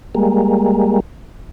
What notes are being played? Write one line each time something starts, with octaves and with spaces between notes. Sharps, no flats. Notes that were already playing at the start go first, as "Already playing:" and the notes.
G3 G#3 A#3